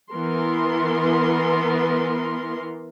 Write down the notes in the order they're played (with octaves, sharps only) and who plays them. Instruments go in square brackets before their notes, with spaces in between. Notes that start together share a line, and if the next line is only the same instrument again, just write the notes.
[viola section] E3 B3 A#4 C6